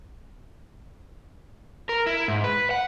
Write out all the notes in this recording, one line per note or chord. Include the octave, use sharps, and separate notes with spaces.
A#4
E4
G#2
B4
F#5